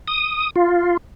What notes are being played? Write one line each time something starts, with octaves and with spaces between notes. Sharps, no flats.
D#6
F4